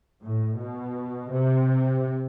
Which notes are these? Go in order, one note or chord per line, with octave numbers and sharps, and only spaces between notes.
A2
B2
C3